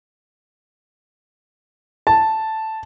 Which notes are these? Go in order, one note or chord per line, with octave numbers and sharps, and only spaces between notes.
A5